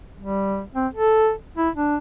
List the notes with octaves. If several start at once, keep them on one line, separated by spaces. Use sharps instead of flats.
G3
C4
A4
E4
D4